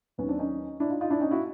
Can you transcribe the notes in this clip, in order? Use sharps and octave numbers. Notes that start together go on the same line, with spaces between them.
D#2 D#3 F#3 B3 C#4
C4 D4
C#4 D#4
D4 E4
D#4 F4
D#4 F4
D4 E4
C#4 D#4
E4 F#4